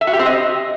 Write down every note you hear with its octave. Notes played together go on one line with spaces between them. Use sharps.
E5
F#4
G4
C4
D#5